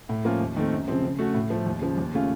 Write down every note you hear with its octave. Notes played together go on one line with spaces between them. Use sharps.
A2
F3 A#3 C#4 F4
D#2
D#3 A3 C4
F#2
C#3 F3 C4
C#3
A3 C#4 F#4
A2
F3 A3
D#2
C#3 F3
D#2
C#3 A3 C#4 F4